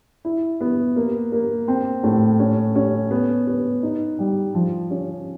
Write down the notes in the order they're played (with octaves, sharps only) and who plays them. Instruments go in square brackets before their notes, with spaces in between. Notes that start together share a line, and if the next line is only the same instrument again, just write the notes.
[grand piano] E4
B3
A#3
A#3
C4
A2
C#4
C#4
B3
B3
D#4
G3
F3
C#4